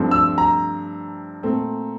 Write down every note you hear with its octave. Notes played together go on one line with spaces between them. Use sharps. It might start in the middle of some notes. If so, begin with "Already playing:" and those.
Already playing: G2 F3 A3 C4
E6
A#5
A#2 A3 C4